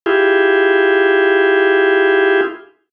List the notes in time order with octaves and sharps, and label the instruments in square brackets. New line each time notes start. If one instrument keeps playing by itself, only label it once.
[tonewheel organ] E4 F4 G4 G#4